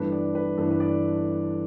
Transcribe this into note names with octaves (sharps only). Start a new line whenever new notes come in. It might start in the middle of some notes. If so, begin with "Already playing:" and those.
Already playing: G1 G2 E3 A3 D4 B4
D5
B4
G1 G2 E3 A3 D4 A4
B4
D5